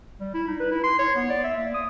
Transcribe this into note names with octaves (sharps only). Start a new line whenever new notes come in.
G3
E4
D#4
B4
E4
C6
C#5
B3
D5
E5
A#3
D#6